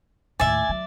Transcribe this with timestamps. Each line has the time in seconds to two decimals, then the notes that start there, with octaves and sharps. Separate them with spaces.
0.40 D#2 A2 D5 E5 G#5
0.69 F#3